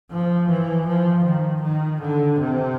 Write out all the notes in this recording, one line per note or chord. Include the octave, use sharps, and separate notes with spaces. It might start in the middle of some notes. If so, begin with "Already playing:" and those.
F3
E3
F3
D#3
D#3
D3
C3